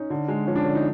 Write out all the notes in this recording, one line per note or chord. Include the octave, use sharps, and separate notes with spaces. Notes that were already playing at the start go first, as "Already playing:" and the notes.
Already playing: C#4 D#4
D3
G#3
F3 C#4
D4
D3 C#4
D#4